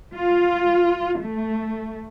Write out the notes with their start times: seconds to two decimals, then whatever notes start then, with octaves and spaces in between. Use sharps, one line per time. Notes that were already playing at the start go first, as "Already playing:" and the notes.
0.15 F4
1.19 A3